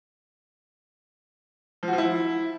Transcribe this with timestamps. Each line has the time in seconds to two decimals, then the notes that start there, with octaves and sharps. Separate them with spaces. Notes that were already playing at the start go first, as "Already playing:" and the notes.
1.83 F3
1.88 F#4
1.93 F3
1.98 E4